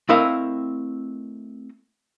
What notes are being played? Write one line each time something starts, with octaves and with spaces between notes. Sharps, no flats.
A3 C4 E4 A#4 D#5 F5